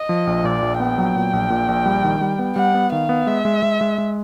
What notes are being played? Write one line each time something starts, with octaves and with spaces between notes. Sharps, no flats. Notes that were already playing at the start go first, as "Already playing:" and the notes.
Already playing: D#5
F3
A#1
A#2 D5
A#1
B3 G5
F#3
A#2
A#1
A#2
A#1
G3
D#3
G3
B3
G3 F#5
B3
D#3 F5
B3
G#3 E5
G#3
G#3
G#3
G#3